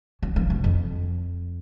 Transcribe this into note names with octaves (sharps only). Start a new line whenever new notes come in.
F#3
F3
F#2
F2